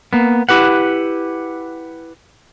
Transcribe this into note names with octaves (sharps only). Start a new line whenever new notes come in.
A#3 B3
E4 G4 B4 F#5